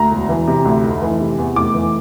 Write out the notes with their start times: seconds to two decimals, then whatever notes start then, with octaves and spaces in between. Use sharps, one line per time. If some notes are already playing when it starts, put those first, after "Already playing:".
Already playing: D2 A#5
0.11 E1
0.29 E3
0.48 C3
0.65 D2
0.84 F1
1.02 E3
1.20 C3
1.38 E2
1.56 F1 D6
1.74 E3